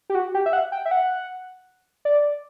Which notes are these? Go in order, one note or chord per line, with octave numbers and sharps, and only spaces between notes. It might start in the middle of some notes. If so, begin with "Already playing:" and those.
G4
F#4
G4
E5
F#5
G5
E5
F#5
D5